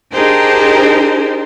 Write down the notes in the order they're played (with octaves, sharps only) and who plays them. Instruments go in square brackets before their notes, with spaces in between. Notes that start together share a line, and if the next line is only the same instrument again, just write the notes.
[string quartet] D4 D#4 G4 G#4 A#4 C5